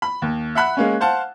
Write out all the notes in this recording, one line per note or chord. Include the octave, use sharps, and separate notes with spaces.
B5
D#2
E5 F#5 B5 F#6
G#3 A#3 C#4
C5 F5 F#5 A5